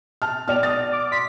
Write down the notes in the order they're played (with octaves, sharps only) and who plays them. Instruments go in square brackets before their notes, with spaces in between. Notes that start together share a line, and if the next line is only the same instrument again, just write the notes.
[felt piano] A5 F6
[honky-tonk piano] B2 D5 F7 [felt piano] F6
[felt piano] D#6 A6
[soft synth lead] D6
[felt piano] C6 [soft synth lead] B6